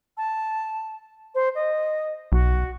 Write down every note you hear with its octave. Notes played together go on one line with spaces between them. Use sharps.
A5
C5
D#5
B1 F#4